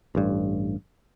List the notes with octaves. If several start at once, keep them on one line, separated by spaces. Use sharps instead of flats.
A1 G2